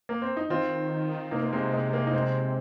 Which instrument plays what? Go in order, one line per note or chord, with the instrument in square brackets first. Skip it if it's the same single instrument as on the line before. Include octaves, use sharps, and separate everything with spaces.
[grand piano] A#3
C4
D#4
[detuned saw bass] D#3 [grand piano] C4 F4
[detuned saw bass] C3 [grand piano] A#3 D#4
[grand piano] A#3
G#3 C4
G#3
A#3
D#4
G#3 C4